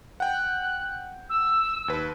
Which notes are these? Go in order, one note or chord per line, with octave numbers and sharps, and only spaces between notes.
F#5 G5 F#6
E6
D#2 B4